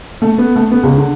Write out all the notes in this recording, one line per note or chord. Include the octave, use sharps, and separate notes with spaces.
A3
B3
A3
B3
C#2
D3